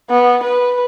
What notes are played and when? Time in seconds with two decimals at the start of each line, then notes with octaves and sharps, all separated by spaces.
0.10 B3
0.43 B4